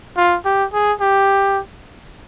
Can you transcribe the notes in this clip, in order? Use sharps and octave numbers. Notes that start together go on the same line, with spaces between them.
F4
G4
G#4
G4